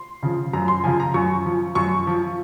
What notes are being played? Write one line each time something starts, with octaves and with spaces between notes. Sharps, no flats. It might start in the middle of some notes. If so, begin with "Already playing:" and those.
Already playing: C6
C#3 F3
F#2 A#5
C6
C#3 F3 G#5
A#5
F#2 C#6
F3
F#2 C#6
F3